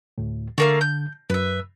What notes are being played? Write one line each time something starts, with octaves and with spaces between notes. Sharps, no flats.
D2 A2
D3 A3 A#3 F5
G6
F#2 B4 E5